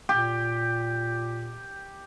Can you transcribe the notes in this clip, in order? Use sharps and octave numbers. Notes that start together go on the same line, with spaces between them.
A#2 G4